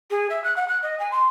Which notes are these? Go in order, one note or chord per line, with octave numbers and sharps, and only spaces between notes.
G#4
E5
F#6
F#5
F#6
D#5
G#5
C6